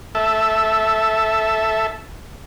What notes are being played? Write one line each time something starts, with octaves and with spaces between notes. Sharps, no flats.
A4 E5